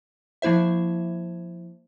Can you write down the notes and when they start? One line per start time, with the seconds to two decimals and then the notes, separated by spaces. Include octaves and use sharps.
0.42 F3 A#3 E4 C5 E5